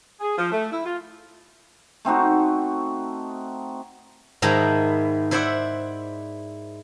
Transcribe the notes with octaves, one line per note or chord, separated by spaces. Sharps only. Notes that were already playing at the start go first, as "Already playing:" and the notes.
G#4
F3
A3
E4
F4
A3 C4 D#4 F#4
G#2 D#3 E4 A5 A#5
E4 C5 D5 E5 F#5